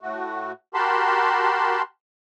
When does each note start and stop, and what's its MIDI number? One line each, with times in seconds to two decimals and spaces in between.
0.01 0.52 45
0.01 0.52 57
0.01 0.52 66
0.74 1.82 66
0.74 1.82 67
0.74 1.82 70
0.74 1.82 81
0.74 1.82 83
0.74 1.82 84